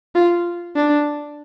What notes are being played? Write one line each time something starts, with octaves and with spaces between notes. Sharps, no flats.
F4
D4